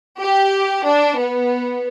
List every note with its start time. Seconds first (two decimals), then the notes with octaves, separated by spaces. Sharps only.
0.20 G4
0.85 D4
1.18 B3